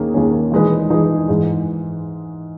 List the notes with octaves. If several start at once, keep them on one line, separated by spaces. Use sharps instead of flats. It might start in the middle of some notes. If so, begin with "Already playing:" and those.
Already playing: D#2 D#3 A#3 C#4 G#4
D#2 D#3 A#3 C#4 G#4
E3 G#3 D#4 G#4 B4
E3 G#3 D#4 G#4 B4
G#2 E3 G#3